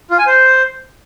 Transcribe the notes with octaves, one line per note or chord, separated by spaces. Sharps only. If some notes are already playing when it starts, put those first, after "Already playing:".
F4
G#5
C5